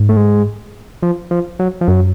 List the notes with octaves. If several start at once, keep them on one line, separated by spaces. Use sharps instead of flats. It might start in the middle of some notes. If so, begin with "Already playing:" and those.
Already playing: G#2
A3
G#3
F3
F3
F#3
F3
F#2 F#3